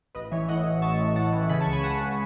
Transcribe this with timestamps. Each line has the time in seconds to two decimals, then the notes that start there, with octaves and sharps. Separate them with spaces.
0.15 A1 B4 D#5
0.31 E3 C#5 E5
0.48 A2 D#5 F#5
0.65 A1
0.82 A1 A5 C#6
0.99 A1
1.16 A2 F#5 A5
1.32 E3
1.49 C#3 G#5 B5
1.61 A5 C#6
1.66 C#2
1.72 G#5 B5
1.83 C#2 F#5 A5
2.01 C#3